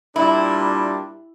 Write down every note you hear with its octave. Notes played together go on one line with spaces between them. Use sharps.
A#2 G3 D4 E4